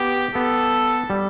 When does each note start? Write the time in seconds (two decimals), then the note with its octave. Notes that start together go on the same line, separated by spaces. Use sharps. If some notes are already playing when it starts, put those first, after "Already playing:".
Already playing: B3 G4
0.35 B3 A4
1.10 G3